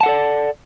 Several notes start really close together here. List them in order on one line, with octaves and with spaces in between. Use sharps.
A5 F#5 A4 D5